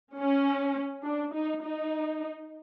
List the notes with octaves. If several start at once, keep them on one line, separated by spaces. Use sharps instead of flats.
C#4
D4
D#4
D#4